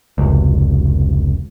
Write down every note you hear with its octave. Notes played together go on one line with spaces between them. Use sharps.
F1 C#2